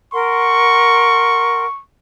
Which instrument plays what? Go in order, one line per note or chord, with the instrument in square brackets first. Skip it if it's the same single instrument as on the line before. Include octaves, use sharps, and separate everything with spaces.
[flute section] A#4 F#5 C6 [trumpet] C#6